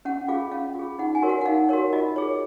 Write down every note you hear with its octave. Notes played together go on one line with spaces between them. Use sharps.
C#4 F#5
F4 G#4 F5
C#4 F5
F4 G#4
D#4 F#5
G#5
F#4 A#4 C#5
F#5
F#5
D#4 F5
F#4 A#4 C#5
F4 D#5
G#4 C#5